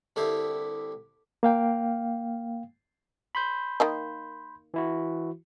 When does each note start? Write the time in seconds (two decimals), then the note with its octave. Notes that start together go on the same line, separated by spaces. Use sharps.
0.16 C2 D3 D4 E4 G4 F5
1.43 A#3 F5 G5
3.35 B5 C6 G6
3.80 D#3 A#3 D#4
4.74 E3 E4 F#4